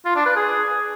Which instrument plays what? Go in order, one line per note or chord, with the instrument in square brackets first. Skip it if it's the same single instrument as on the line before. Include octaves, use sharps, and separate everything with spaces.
[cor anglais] F4
D4
B4
G#4